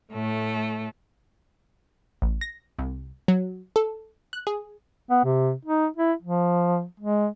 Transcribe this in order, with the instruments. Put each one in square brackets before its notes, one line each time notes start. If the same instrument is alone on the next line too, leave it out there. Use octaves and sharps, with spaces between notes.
[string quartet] A2 A3
[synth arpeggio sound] A1
A#6
C2
F#3
A4
F#6
G#4
[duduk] B3
C3
D#4
E4
F3
G#3